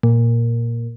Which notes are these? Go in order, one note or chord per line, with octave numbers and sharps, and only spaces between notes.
A#2